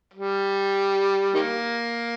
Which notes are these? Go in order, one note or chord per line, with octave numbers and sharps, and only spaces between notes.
G3
D#3 G3 A#3